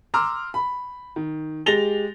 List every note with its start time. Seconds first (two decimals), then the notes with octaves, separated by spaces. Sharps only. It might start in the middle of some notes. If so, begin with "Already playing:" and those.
0.14 A#5 C6 D6 E6 F6
0.54 B5
1.16 D#3
1.66 G#3 G4 A6 A#6 F7 G7